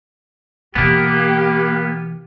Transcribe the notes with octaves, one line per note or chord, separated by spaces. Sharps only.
B2 E3 A#3 B3 G4